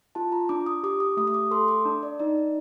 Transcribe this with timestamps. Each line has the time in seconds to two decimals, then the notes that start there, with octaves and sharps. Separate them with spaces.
0.15 F4 A5
0.32 A#5
0.49 D4 D6
0.66 D#6
0.83 G4 D6
1.00 D#6
1.17 A3 D#6
1.27 D#6
1.34 D6
1.51 A4 C6
1.68 D6
1.85 D4
2.03 D5
2.20 D#4 D5